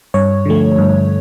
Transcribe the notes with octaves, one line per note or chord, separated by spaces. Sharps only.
G2 C#5
D3 F3 A3
G2